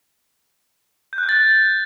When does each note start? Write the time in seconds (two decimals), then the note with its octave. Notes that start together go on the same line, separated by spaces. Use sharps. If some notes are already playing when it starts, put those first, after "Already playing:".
1.13 G6
1.18 F#6
1.23 G6
1.29 A6